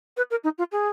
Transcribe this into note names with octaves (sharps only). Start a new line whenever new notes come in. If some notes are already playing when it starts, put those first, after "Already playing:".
B4
A#4
D#4
F4
G#4